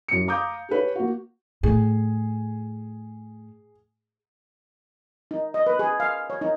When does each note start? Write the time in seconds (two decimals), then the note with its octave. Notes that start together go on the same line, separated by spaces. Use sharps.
0.08 F#2 C#7
0.28 F5 A#5 D6 D#6 G6
0.69 G4 G#4 B4 C#5
0.95 A#3 F#4
1.63 A2 G#4
5.31 D#4
5.54 D#5
5.67 B4
5.79 G#4
6.00 F5
6.30 C#5
6.41 D#4